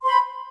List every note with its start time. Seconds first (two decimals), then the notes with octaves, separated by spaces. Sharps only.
0.01 C6
0.04 C5
0.07 B5